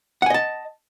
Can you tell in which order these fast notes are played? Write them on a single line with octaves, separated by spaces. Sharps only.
F#5 G#5 D#5 A5